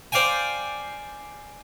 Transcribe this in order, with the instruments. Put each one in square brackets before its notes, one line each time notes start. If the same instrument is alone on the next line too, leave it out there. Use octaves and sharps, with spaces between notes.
[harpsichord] C5 D5 F5 G5 G#5